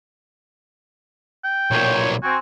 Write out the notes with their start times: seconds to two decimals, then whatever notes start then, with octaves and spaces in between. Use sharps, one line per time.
1.44 G5
1.71 B1 A#2 C#5
2.23 C4 F#4 G#5